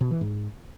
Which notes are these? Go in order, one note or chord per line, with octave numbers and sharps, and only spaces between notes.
B2
E3
G#2